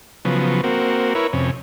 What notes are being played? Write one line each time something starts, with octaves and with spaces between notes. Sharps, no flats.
C#3 F3 F#3 B3
A#3 C4 F#4
E4 A#4 B4 C#5
F2 C3 C#4